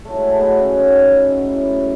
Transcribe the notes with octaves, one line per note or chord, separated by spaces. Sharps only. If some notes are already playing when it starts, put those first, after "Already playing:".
A2 F#3 A3
G#3
A3
B2 F#3 B3
C#4
B2 F#3 D#4
F#2 C#3 F#3
A2 F#3 E4